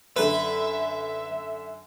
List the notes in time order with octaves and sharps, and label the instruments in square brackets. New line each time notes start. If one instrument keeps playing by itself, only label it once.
[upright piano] F#2 D3 [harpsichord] B4 [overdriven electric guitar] E5